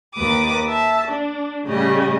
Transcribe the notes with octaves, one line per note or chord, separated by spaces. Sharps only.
D#2 B4 D6 D#6
E5 A5
D4
A2 C#3 G3 D#5